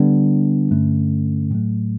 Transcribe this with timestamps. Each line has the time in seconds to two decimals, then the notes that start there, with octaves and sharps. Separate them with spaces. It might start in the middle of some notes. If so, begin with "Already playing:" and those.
Already playing: D3 G3 B3 D4
0.71 G2 D3 A3 C#4
1.50 A2 F#3 A3